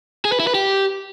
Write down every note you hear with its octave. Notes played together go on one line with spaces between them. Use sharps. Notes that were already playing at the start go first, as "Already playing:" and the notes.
G#4
B4
E4
B4
G4